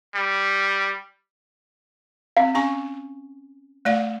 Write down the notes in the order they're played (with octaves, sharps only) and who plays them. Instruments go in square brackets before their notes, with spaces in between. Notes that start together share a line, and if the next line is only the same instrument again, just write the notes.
[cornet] G3
[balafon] C4 [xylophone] F5
[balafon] C#4 G#5 C#6
A3 D5 F5